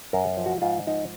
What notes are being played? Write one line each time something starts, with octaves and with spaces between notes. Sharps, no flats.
F#2 A#4
F3
F#4
G#2 F4
F3 D#4